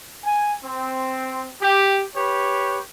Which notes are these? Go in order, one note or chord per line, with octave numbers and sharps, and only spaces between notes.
G#5
C4
G4
G4 B4 C#5